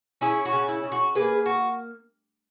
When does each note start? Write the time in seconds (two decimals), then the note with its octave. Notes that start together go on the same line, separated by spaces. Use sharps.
0.21 C#4 E4 G#4
0.45 F#4
0.53 C#3
0.68 E4
0.83 C#3
0.92 F#4
1.15 A#3 G#4 B4
1.46 F#4